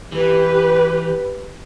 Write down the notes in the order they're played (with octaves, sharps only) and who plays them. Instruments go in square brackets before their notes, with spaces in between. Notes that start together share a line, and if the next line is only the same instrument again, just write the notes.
[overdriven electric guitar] E3 [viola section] G4 B4